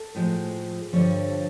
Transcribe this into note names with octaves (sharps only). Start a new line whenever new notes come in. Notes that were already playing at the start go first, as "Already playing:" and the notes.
Already playing: A4
A2 F3 G#3
G2 D3 F3 C#5